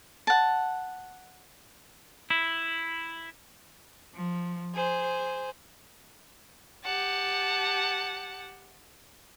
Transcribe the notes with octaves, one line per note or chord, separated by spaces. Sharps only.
F#5 A5
E4
F3
G#4 C5
G4 F#5 A5